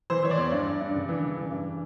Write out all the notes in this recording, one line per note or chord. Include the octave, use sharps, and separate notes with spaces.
E3 C5
E3 C#5
D5
E2
G2
G2
G2
C#3
E3
C#3
E3
G2